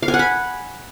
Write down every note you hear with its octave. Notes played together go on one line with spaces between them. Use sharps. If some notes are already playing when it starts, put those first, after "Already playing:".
F5
G#5
F#5
B5